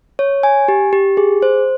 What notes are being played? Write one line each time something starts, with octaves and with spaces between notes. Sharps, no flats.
C#5
G#5
G4
G4
G#4
C5